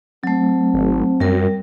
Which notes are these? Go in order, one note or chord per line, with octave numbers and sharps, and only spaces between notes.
F#3 A3 C4
G#1
F#2 G3 A#4